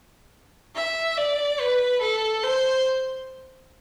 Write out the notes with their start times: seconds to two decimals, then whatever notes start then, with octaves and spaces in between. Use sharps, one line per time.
0.75 E5
1.17 D5
1.60 B4
2.01 A4
2.43 C5